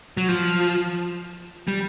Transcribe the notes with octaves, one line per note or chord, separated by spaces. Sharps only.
F#3
F3
G3